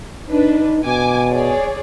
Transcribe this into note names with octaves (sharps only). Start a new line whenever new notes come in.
D4 D#4 B4
B2 G#5 D6
G#4 C#5 D5